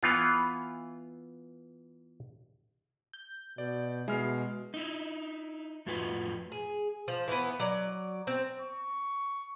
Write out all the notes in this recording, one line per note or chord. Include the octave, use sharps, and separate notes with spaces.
E3 B3 F4
G6
B2 D5
B2 G#3 E4 G#4 F6 C7
D#4 E4
F2 A2 F4 F#4 B4 G#5
G#4
F3
E3 B3
F#3 D5
C4
C#6